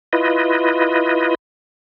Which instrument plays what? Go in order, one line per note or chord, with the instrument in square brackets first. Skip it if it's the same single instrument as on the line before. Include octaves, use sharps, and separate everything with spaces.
[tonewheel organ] E4 F4 B4 D#5